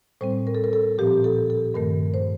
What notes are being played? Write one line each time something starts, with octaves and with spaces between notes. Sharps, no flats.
A2 G3 C4 C5
A#4
A4
A#4
A4
A#2 F3 C4 G4
A4
A4
G2 D#3 A3 A#4
C5